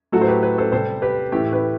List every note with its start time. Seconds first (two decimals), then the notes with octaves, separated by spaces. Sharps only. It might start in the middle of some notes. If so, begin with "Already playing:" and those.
0.12 A2 F#3 A3 F#4 A4
0.21 C5
0.28 G4 B4
0.43 G4 B4
0.58 A4 C5
0.72 C3 G3 A4 C5
1.02 G4 B4
1.32 A2 E3 A3 G4
1.52 G4 B4